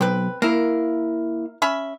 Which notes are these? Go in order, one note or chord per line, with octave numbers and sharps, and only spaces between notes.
B1 C4 B4
A#3 E4 A#4
C#4 E5 B5